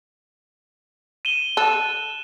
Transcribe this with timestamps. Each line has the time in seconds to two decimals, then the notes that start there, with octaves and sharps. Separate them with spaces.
1.25 D#7 E7 G7
1.57 A4 F#6 E7